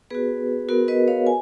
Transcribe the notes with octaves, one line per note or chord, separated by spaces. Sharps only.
B3 F#4 G#4 B4
B3 F#4 A#4
B4 D#5
C#5 F5
G#5